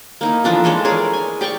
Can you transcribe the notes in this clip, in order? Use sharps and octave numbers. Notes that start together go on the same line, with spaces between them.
A#3 D#4 E4
E3 F3 D4 A4
E3 G#3 A4 C#5
G#4 A#4 C#5 D5
G#5
G4 D5 G5 C#6